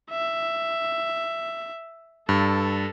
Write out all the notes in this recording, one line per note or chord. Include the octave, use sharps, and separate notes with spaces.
E5
G2 A4